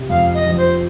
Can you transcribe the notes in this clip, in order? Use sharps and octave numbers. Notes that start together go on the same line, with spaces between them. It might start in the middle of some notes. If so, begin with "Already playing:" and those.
Already playing: C3
F2 F5
D#5
F3
C5